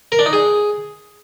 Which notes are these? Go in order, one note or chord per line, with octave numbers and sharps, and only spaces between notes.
A#4
D4
D#4
G#4